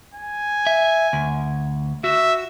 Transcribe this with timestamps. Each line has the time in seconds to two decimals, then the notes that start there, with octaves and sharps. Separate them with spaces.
0.14 G#5
0.67 E5
1.13 D2
2.04 F#4 E5